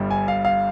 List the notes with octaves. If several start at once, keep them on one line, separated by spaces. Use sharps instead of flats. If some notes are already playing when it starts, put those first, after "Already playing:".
Already playing: G1 G2 D3 G3
G#5
F5
F5